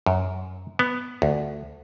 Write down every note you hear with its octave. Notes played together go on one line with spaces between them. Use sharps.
F#2
B3
D2